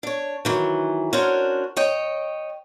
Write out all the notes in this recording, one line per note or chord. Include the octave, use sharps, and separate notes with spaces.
D4 C#5
D#3 E3 F#3
C#4 D4 F#4 A#4 C5 C#5
C#5 D#5 G5